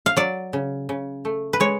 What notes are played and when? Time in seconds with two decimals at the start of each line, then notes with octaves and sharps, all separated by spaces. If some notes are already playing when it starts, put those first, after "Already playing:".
0.06 F5
0.16 F#3 D5
0.53 C#3
0.89 C#3
1.25 A3
1.53 B4
1.60 G#3 C#5